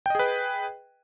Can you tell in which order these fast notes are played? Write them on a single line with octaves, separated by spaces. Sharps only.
G5 D#5 G#4 B4